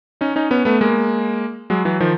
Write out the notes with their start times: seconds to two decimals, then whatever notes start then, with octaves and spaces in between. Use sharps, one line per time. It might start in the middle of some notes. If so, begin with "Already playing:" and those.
0.21 C#4 D#4
0.36 C#4 D#4
0.51 B3 C#4
0.65 A3 B3
0.81 G#3 A#3
1.70 F#3 G#3
1.85 E3 F#3
2.00 D#3 F3